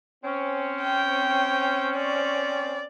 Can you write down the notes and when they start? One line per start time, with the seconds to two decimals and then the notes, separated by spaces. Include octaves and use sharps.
0.24 C4 C#4
0.82 G5
1.97 D5